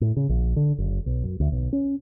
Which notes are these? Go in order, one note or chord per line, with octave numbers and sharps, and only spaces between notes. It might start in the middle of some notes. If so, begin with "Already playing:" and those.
A2
C#3
A#1
D3
F#1
B1
F#2
D2
B1
C#4